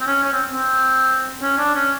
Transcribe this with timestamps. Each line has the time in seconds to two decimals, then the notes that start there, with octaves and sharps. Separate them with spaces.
0.01 C4
0.07 C#4
0.23 C#4
0.33 C4
0.52 C4
1.41 C#4
1.58 D4
1.75 C#4